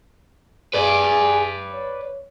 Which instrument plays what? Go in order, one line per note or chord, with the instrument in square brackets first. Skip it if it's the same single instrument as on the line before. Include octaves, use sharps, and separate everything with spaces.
[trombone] G#4 [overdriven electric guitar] B4 D5
[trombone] C#5